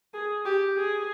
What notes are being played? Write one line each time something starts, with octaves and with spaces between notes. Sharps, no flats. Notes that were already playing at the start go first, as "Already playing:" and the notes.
G#4
G4
G#4